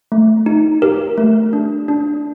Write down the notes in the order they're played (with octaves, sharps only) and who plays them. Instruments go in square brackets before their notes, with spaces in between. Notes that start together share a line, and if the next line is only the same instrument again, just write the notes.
[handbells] A3
D#4
G4 A#4
A3
D4
D4